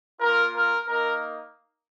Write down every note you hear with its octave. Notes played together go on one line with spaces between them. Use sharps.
A#3 F4 A#4
A#4
A#3 D#4 A#4